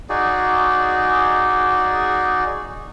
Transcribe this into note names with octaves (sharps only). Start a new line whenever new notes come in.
D#4 F#4 G#4 D5